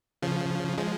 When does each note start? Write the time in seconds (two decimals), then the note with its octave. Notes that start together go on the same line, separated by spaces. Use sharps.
0.22 C#3 F3
0.78 F3 G#3